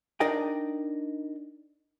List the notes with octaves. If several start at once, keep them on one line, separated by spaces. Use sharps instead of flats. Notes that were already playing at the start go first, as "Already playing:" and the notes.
D4 D#4 A#4 D5 D#5 G5